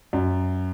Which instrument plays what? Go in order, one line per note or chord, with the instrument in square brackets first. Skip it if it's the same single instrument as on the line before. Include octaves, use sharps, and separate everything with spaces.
[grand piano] F#2